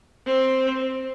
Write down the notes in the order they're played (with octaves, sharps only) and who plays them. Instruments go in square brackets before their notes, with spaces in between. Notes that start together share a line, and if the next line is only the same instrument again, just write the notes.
[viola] C4